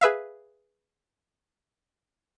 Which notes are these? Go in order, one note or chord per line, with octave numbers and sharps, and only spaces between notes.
G#4 B4 E5 F5